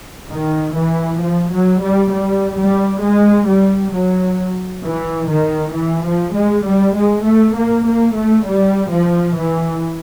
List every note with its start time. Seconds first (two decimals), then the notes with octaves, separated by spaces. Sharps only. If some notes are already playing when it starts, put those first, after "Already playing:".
0.30 D#3
0.76 E3
1.21 F3
1.52 F#3
1.82 G3
2.13 G3
2.58 G3
3.02 G#3
3.48 G3
3.94 F#3
4.84 E3
5.29 D#3
5.75 E3
6.05 F3
6.35 G#3
6.65 G3
6.96 G#3
7.25 A3
7.56 A#3
7.86 A#3
8.16 A3
8.46 G3
8.92 F3
9.37 E3